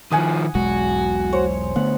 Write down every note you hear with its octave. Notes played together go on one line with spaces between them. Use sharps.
D#3 F3 F#5 G#5 D#6
E1 B1 G#3 F#4
C5 C#5
D3 A3 B3 F#5